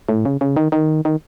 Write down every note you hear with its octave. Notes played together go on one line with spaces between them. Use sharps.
A2
C#3
C#3
D#3
D#3
D#3